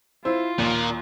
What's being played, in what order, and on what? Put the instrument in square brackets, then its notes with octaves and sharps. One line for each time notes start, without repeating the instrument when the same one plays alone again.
[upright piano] E4 C5 [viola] F4
[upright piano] D#2 [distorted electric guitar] A#2